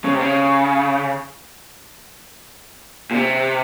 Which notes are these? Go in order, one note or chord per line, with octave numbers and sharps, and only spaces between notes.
C#3
C3
C#3
A#2
C3